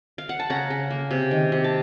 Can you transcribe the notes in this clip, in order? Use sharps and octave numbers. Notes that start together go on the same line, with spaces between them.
F5
F#5
A5
C#3 F#5 A#5
C#3
A#3
C3
D#3
C3
A5